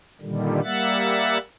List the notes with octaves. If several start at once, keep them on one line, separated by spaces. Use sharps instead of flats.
A#2 D3 D#3 G3
G3 A#3 E5 F#5 F#6 A6